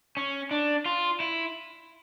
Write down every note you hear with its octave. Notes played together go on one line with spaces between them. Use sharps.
C#4
D4
F4
E4